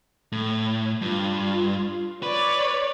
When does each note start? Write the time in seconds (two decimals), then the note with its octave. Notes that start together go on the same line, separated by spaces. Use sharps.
0.32 A2
1.02 G2 F4
2.23 B4 C#5 D5